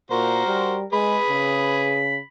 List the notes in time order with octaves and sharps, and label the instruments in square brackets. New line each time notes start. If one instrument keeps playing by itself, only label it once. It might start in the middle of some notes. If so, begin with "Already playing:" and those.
[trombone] A#2 [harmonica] F#4 C5 [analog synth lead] A#4
[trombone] G3
[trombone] G#3 [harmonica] G#4 B4 [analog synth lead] B5
[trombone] C#3